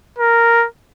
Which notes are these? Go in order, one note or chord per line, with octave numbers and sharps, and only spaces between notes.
A#4